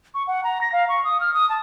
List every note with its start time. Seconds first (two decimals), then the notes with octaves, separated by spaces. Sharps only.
0.14 C#6
0.27 F#5
0.44 A#5
0.61 A#6
0.73 F5
0.89 C#6
1.04 D#6
1.20 F6
1.34 D#6
1.49 A5